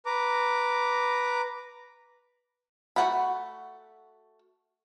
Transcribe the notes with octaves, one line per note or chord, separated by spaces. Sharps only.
B4 A#5 D6
A3 F#4 F#5 A#5 B5